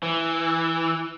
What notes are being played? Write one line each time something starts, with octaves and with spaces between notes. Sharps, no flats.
E3